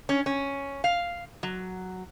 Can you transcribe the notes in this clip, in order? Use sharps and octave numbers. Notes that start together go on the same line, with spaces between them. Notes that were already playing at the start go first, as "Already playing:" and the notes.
C#4
C#4
F5
F#3